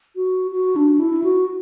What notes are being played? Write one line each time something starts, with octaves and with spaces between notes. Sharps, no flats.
F#4
F#4
D4
E4
F#4